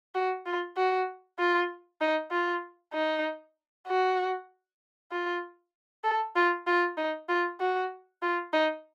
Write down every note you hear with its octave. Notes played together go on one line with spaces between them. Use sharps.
F#4
F4
F#4
F4
D#4
F4
D#4
F#4
F4
A4
F4
F4
D#4
F4
F#4
F4
D#4